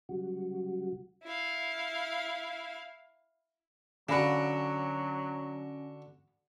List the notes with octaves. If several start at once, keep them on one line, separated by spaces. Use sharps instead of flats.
C#3 F#3 G3 F#4
E4 F5
D3 F#3 C#4 F#4 F5 B5 A#6 D7